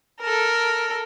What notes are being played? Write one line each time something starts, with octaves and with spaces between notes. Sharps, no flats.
A4 A#4